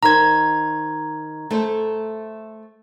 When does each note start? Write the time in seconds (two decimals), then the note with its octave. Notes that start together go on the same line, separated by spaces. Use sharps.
0.03 D#3 C5 A#5 G#6
1.50 A3 A4 C5